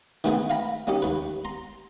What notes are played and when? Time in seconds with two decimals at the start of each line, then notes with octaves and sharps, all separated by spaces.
0.24 D#3 A3 B3 C4 G#4 B4
0.50 F5 G5 A#5 B5
0.87 A#3 C#4 D#4 G4
1.02 D#2 B4
1.45 A#5 C6